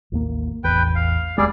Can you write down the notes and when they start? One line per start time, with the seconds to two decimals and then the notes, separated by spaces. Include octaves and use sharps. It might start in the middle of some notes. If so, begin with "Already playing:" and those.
0.12 A1 D#2 A#3
0.64 E1 A1 E2 B4 G5
0.95 F5
1.38 D#1 D#2 G3 G#3 G#4 D5